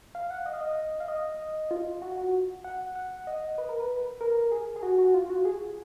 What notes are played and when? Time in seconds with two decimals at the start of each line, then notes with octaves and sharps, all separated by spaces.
0.15 F5
0.31 F#5
0.46 D#5
0.53 F5
0.61 D#5
1.00 F5
1.08 D#5
1.71 F4
2.02 F#4
2.18 F#4
2.64 F#5
2.95 F#5
3.27 D#5
3.58 B4
3.69 A#4
3.80 B4
4.21 A#4
4.52 G#4
4.76 G#4
4.83 F#4
4.98 F#4
5.14 F4
5.30 F#4
5.45 G#4